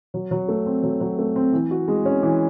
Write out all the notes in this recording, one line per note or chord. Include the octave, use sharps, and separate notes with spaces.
F#3
F#3
A3
C4
F#3
F#3
A3
C4
E3
F#4
G#3
C#4
E3